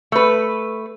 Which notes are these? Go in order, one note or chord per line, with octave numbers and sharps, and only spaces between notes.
A3 B4